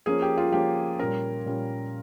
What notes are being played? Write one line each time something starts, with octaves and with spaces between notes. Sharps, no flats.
F3 A#3 C#4 G#4
G4
F4
F3 A#3 C#4 G4
A#2 G3 C#4 A#4
A#2 G3 C#4